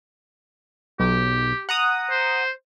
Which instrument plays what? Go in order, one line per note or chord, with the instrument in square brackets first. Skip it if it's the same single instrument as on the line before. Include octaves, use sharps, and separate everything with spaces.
[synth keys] B1 [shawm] G4
[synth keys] F#5 A#5 D#6
[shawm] C5